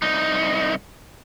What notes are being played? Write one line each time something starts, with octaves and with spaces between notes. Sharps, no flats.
C2 D#4